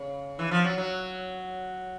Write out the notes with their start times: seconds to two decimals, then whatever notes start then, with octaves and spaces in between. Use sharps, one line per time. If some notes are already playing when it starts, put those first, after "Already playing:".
Already playing: C#3
0.39 E3
0.52 F3
0.65 F#3
0.78 F#3